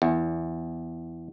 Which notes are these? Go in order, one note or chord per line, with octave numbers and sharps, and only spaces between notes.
E2